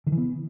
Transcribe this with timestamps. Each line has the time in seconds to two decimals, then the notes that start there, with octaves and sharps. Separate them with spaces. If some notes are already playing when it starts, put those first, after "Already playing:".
0.07 D#3
0.12 E3
0.18 B3